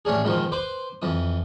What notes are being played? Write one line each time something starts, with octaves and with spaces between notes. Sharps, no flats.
A1 C#4 D4 G#4
G#2 B2 D#3 F3
B4 C5 D6
F2 E3 D#6